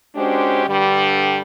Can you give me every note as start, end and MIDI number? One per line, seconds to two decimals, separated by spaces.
0.15 0.65 56
0.15 0.65 61
0.15 0.65 62
0.15 0.65 66
0.15 0.65 67
0.15 0.65 72
0.67 1.41 43
0.67 1.41 50
0.67 1.41 55